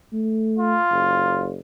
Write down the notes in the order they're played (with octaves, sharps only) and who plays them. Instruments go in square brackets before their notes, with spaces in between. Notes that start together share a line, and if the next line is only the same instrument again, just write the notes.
[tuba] A3
[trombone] F4
[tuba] F#1